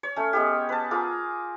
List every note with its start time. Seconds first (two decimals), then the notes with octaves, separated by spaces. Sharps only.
0.03 C#5
0.16 A3 C#4
0.33 G#3 B3 G4
0.69 B4 A5
0.91 F4 G#4 A#4 D6